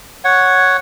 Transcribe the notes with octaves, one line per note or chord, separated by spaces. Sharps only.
C#5 F#5